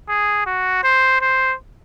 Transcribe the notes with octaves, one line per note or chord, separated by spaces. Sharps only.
G#4
F#4
C5
C5